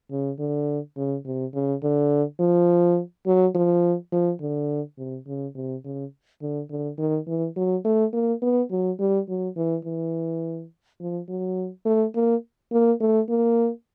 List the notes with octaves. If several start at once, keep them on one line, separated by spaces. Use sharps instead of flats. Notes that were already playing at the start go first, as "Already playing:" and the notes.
C#3
D3
C#3
C3
C#3
D3
F3
F#3
F3
F3
D3
C3
C#3
C3
C#3
D3
D3
D#3
E3
F#3
A3
A#3
B3
F#3
G3
F#3
E3
E3
F3
F#3
A3
A#3
A#3
A3
A#3